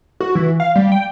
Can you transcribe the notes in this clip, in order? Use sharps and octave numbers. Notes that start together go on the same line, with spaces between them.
F#4
E3
F5
G3
G5